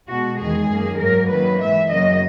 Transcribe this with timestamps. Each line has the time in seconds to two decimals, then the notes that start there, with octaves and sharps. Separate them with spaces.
0.09 B2 G#3 F#4
0.39 E2 D#3 G#3 G#4
0.69 F#2 D#3 A#3
0.99 G#2 F#3 A#3 A#4
1.29 F#2 D#3 F#3 A#3 B4
1.59 G#2 E3 G#3 E5
1.89 F#2 C#3 F#3 A#3 D#5